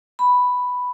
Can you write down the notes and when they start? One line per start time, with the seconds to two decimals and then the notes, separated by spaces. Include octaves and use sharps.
0.19 B5